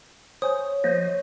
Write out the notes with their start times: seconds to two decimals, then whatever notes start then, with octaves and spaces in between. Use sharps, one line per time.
0.42 C5 C#5 G#5 D#6 G6
0.84 F3 A#3 C5 D#5